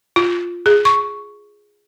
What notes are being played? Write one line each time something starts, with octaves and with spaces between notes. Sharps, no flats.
F4
G#4
C#6